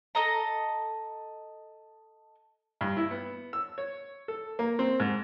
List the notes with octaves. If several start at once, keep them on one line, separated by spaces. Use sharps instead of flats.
A4 D#5 A#5
G2
E4
B3
E6
C#5
A4
A#3
C4
G#2